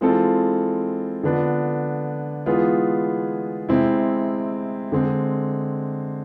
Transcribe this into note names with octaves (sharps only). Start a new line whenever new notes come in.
E3 G#3 C4 F4 A4
D3 F3 B3 D4
E3 G#3 B3 F4 G#4
C3 G#3 C4 E4
D3 G#3 C4